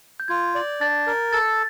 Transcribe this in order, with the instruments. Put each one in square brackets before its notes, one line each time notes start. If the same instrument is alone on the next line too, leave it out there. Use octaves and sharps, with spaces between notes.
[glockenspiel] G6
[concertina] F4 [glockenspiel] G#6
[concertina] D5
[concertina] D4 [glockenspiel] A6
[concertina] A#4
[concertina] A4 [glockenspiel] A6